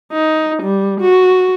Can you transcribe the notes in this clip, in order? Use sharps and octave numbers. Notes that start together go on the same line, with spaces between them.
D#4
G3
F#4